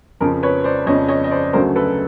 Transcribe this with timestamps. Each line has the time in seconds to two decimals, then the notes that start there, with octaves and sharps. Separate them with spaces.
0.20 F2 C#3 F3 A#4
0.43 B4 C#5
0.64 C5 D5
0.86 F2 C#3 F3 C#5 D#5
1.08 C#5 D#5
1.24 D#5
1.31 C5 D5
1.53 D2 C#3 F#3 A3 A#4 C5
1.76 A4 B4